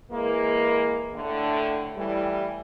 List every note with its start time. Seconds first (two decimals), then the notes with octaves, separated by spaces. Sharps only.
0.12 E3 G#3 A#3
1.15 A2 D3
1.97 A2 E3 G3